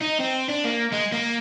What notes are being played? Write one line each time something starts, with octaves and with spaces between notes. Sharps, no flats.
D#4
C4
D4
A#3
G#3
A#3